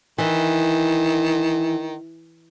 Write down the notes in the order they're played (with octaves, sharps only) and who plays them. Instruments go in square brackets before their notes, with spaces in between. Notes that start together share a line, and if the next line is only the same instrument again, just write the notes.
[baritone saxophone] D#3 [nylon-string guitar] E3